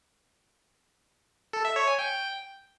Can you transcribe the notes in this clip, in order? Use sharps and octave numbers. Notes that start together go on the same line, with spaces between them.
A4
E5
C#5
G#5
G5